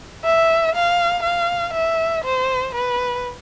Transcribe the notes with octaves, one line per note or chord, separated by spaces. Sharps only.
E5
F5
F5
E5
C5
B4